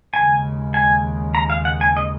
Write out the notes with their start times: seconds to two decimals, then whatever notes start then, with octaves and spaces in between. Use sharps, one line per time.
0.13 D#2 C#3 G#3 G#5
0.74 G#5
1.35 A#5
1.50 F5
1.65 F#5
1.81 G#5
1.97 D#5